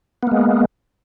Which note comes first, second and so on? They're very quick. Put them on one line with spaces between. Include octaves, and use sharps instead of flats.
B3 A#3 G#3